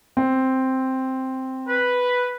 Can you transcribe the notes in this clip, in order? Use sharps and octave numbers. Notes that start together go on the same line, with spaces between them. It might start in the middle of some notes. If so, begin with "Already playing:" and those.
C4
B4